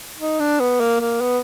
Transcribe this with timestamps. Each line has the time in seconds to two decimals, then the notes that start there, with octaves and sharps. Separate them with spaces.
0.20 D#4
0.40 D4
0.60 B3
0.80 A#3
1.01 A#3
1.21 B3